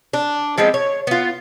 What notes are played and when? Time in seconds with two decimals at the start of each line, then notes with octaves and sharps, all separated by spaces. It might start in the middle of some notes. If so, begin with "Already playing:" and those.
0.13 D4
0.58 F3 G#3 B3 C4
0.74 C#5
1.07 B3 F4